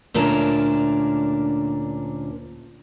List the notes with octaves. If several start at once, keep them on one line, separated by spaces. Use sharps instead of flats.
D2 A#2 C#4 D4 A#4 A5